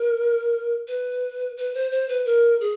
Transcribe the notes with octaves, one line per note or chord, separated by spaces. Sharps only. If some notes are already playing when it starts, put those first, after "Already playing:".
Already playing: A#4
B4
B4
C5
C5
B4
A#4
G#4